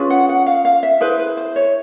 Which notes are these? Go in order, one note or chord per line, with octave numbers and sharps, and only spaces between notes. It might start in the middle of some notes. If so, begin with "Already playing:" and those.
Already playing: C#4 F4 G#4 B4
F#5
F#5
F5
F5
E5
E4 G#4 B4 C5
B4
C5
C#5